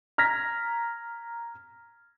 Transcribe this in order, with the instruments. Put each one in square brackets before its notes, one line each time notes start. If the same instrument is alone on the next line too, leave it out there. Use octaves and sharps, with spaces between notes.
[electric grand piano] A#5 F6 G#6 A#6 B6